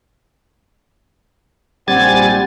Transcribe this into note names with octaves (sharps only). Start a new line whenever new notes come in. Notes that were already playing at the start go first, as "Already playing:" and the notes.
A#1 G3 C4 F#5 G#5 A6